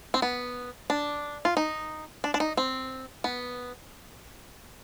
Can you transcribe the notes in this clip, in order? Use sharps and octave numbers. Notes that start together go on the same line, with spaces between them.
C4
B3
D4
F4
D#4
D4
D4
D#4
C4
B3